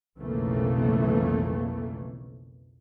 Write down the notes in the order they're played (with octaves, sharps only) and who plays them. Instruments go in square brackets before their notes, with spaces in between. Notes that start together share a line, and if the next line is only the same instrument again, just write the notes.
[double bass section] B1 F2 C#3 E3 A3 A#3